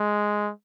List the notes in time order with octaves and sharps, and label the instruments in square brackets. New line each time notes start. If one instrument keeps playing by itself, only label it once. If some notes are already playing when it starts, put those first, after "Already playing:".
Already playing: [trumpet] G#3